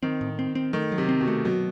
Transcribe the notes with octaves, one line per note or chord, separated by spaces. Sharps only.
D#3 C4
A2
C4
C4
D#3 A3
F#3
C3
C4
B2
A3
B2 F#3